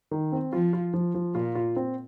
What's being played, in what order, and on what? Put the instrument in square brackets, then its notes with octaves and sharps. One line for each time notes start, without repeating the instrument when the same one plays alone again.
[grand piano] D#3
C4
[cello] F3 [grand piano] F4
[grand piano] F4
F3
F3
[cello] A#2 [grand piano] F4
[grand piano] F4
C4